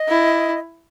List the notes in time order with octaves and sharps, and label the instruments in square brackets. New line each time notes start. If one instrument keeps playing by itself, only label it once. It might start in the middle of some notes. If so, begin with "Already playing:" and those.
Already playing: [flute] D#5
[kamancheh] E4